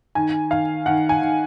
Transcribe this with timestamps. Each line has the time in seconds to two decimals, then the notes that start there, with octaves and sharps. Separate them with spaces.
0.15 D#3 G#5
0.50 D#3 F5
0.86 D#3 F#5
1.09 G#5
1.22 D#3